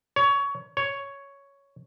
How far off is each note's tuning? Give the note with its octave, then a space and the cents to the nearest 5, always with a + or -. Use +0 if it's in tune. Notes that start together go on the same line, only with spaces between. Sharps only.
C#5 +20
C#5 +5